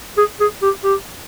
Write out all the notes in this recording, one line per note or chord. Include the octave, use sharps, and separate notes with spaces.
G#4
G#4
G4
G4